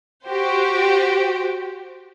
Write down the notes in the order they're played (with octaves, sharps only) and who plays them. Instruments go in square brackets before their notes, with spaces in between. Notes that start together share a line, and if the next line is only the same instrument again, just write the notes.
[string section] F#4 G4 C5